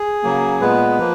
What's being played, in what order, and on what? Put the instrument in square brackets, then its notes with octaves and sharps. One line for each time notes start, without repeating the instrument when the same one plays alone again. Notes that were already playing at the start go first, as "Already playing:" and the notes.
Already playing: [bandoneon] G#4
C#3 F#3 A#3
A#2 G#3 B3 B4
F3 A#3